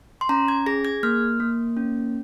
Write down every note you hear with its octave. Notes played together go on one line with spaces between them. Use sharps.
C6
C#4 A#5
G#6
G#4 A#6
G#6
A#3 F6
A#3
C#4